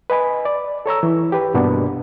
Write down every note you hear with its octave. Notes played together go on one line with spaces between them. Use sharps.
B4 D#5 G#5 B5
D5
A4 C#5 A#5 E6
E3
G4 B4
G2 B2 A#3 B3 D4